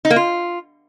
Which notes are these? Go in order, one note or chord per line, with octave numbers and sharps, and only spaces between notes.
D#4
A#3
F4